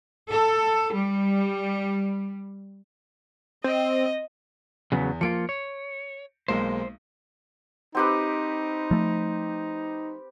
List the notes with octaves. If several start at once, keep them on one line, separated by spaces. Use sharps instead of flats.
A4
G3
C4 D#5
E2 C#3 F#3 B3
F3 A#3 F4 C#7 D7
C#5
B1 G#3 A#3 C5
C4 D#4 G4 B4
F3 A3